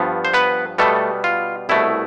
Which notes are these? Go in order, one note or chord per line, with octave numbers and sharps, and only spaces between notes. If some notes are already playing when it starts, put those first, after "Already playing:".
Already playing: G2 F3 B3
C5
B3 B4
B2 G3 A3 B3 A4
F4
C2 B2 A3 E4